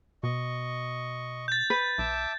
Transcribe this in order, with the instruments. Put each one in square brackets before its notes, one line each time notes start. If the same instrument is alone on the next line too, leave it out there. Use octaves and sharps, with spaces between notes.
[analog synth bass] B2 [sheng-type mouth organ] D#5 C#6
[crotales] G6 A6
[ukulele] B4
[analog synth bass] B1 [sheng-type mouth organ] E5 A5 D6